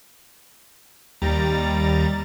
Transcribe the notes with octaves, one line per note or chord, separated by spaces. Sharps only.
D#2 G3 A#5 A6